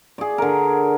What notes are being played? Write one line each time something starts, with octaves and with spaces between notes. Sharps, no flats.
G#4 D5
D3 A#4